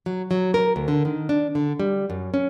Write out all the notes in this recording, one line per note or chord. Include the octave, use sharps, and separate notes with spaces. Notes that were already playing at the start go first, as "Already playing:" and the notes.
F#3
F#3
A#4
D2
D3
D#3
D4
D3
G3
F#2
C#4